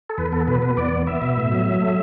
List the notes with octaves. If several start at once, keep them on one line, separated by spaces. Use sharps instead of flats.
A4
E2 B4
B3 A4
B2 B4
B3 B4
E2 D5
B3
B3 E5
B2
A2
F#3
F#3
A3